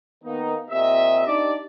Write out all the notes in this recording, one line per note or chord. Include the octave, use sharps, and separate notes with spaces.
D#3 A#3 B3 D#4
A#2 C4 G4 D#5 E5
D4 D#4 G4 D5